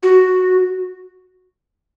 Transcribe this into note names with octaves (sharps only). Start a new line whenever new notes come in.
F#4